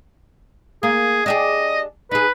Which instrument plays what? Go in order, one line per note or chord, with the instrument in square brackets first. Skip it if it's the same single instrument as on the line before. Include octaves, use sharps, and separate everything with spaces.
[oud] A#3 [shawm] G#4
[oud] D4 G4 G#4 [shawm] D#5
[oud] D#4 G#4 [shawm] B4